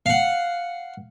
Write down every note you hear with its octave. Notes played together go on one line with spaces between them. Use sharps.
F5 F#5